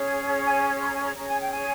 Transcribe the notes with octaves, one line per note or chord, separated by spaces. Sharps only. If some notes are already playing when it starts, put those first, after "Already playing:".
Already playing: C#4 G#4 C#5
G#5
C6
A#5
G#5
A#5
C#4 G#4 C#5 A#5
G#5
G5
G#5